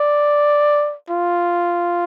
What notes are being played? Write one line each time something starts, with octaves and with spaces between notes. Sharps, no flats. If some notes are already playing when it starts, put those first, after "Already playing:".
Already playing: D5
F4